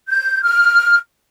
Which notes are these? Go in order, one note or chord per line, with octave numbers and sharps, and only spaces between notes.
G6
F6